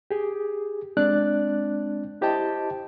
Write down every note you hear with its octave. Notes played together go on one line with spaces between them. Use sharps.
G4 G#4
G#3 C4 D4 D5 F#6
E4 G4 C5 D#5 G5 A5